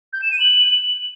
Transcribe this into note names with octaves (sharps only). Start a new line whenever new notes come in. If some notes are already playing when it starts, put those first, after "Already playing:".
G6
E7
D#7
F#7